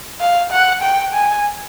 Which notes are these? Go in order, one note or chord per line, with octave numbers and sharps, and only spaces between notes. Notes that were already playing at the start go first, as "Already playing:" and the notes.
F5
F#5
G5
G#5